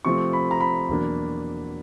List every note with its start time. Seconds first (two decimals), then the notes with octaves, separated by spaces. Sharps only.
0.05 C3 F3 A3 C4 C#6
0.33 B5
0.51 A#5
0.60 B5
0.89 E2 B2 F#3 A#3 D4